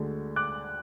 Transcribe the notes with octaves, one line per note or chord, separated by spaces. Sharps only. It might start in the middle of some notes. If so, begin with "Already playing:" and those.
Already playing: D2 D3 G#3
D6 F#6